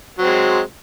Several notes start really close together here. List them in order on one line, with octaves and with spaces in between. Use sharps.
F#3 C4 G#3